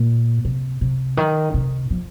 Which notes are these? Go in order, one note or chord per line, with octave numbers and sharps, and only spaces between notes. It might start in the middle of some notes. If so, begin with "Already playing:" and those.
Already playing: A#2
C3
C3
D#3
C3
F3